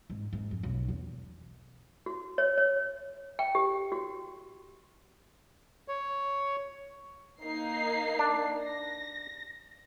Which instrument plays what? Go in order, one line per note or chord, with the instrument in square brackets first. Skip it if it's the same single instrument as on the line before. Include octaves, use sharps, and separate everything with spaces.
[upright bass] G#2
G#2
F2
B1
E2
[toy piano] F#4
C#5
C#5
G5
G4
F#4
[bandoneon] C#5
[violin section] A#3 D#4 C7
[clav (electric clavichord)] D4
[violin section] A#6